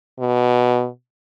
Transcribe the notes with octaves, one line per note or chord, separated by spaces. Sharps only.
B2